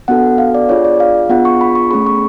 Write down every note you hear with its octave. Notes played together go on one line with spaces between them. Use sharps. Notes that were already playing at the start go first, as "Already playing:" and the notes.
B3 D4 F#4 A4 F#5
F5
D5
D4 F4 G#4 C#5
D5
F5
B3 D4 F4 G#4 F#5
C#6
B5
C#6
A3 C#4 G#4 B5
C#6